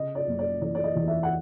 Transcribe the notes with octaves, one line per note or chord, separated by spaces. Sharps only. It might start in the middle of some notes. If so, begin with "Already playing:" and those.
Already playing: C#3 D#5
D5
F#1
D5
E3 D5
D5
D#5
E2
E5
F#5